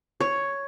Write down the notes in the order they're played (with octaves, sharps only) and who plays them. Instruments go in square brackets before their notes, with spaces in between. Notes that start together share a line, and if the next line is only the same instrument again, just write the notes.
[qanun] C#5